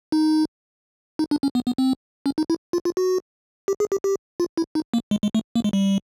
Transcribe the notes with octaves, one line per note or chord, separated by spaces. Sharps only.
D#4
D#4
D4
C#4
B3
B3
C4
C#4
D#4
E4
F4
F4
F#4
G4
G#4
G4
G4
F4
E4
D#4
A#3
G#3
G#3
A3
A#3
G#3
G3